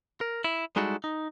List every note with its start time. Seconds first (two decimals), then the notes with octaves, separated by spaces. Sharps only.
0.21 A#4
0.44 E4
0.76 G3 G#3 D#4 E4 F#4 A4
1.04 D#4